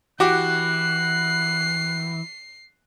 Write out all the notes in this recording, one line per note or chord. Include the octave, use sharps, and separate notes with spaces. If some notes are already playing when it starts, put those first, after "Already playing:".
E3 F#4 G4 D6 F#6 C7